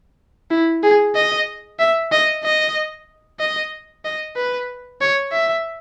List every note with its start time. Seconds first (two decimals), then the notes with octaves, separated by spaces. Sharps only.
0.50 E4
0.83 G#4
1.15 D#5
1.79 E5
2.12 D#5
2.44 D#5
3.40 D#5
4.05 D#5
4.36 B4
5.01 C#5
5.32 E5